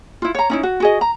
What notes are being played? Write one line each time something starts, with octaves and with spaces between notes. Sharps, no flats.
E4 F4
C#5 A#5
C#4 D#4 E4
F#4
F#4 G#4 D#5
A#5